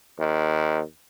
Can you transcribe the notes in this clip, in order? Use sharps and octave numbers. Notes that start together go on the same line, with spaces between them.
D#2